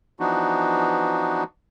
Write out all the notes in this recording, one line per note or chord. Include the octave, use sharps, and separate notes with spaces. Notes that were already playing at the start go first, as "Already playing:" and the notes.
E3 F3 B3 D4 D#4 F#4